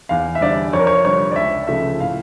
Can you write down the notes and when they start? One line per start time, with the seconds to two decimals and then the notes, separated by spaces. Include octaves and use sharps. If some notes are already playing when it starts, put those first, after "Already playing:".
0.09 E2 F5
0.35 E5
0.41 D3 G3 D5
0.73 F2 C#5
0.80 A#4
0.87 C#5
1.05 D3 G3 C#5
1.31 D5
1.36 C#2 E5
1.67 C#3 F3 A3 E5
2.00 A2 F5